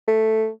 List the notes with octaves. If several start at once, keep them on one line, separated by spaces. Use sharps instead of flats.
A3